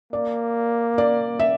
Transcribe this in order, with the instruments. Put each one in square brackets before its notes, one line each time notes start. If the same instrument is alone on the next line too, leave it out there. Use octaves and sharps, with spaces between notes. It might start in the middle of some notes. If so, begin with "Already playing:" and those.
[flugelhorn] A#3 [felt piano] D5
[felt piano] D5
E5